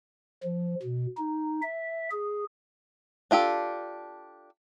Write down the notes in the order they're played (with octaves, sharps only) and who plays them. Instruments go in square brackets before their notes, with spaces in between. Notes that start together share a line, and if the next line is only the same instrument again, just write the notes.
[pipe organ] F3
B2
D#4
E5
G#4
[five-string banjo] D4 F4 G4 A4